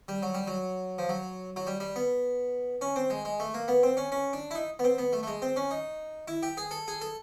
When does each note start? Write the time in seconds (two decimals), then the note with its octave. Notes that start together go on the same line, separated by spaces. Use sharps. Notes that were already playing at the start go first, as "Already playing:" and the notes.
0.08 G3
0.22 F#3
0.34 G3
0.47 F#3
0.98 F3
1.09 F#3
1.56 F#3
1.67 G3
1.80 G3
1.96 B3
2.81 C#4
2.96 C4
3.10 G#3
3.25 G#3
3.40 A3
3.54 A#3
3.68 B3
3.83 C4
3.97 C#4
4.12 C#4
4.33 D4
4.51 E4
4.55 D#4
4.79 B3
4.84 C4
4.98 B3
5.13 A3
5.23 A3
5.27 G#3
5.42 C4
5.56 C#4
5.71 D#4
6.28 E4
6.43 G4
6.57 G#4
6.71 A4
6.88 G#4
7.01 A4